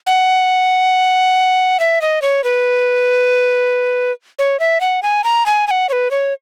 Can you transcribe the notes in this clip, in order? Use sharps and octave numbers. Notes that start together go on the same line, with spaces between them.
F#5
E5
D#5
C#5
B4
C#5
E5
F#5
G#5
A#5
G#5
G#5
F#5
C#5
B4
C#5